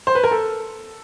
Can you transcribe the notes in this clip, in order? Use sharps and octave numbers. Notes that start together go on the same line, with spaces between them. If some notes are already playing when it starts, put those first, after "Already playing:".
C5
B4
A#4
A4